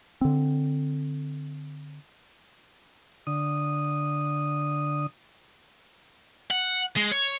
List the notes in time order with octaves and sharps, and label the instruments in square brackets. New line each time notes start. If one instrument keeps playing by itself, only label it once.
[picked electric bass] D3 C4
[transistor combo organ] D3 D#6
[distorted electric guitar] F#5
G#3
C#5